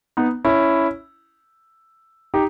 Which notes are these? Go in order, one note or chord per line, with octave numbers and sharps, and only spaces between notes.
B3 D#4
C#4 E4
D#4 G4